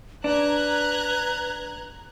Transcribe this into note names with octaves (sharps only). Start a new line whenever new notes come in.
D4 B4 A#5 F#6 G#6